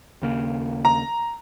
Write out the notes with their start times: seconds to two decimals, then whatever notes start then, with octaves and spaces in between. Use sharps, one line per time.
0.22 D#2 C#3 A#3
0.85 A#5